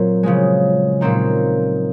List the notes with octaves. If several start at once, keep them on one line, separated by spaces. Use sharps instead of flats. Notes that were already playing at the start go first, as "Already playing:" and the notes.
Already playing: A#2 F#3 C4
C#3 F3 G#3
A#2 F#3 C4 D#4